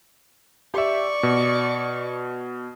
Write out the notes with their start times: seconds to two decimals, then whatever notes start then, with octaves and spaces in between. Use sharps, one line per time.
0.74 G4 D5 E5 C#6
1.23 B2